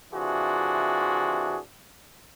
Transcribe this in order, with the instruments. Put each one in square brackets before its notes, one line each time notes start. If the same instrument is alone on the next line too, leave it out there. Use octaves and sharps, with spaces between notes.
[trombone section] C3 E3 D4 F4 F#4 G#4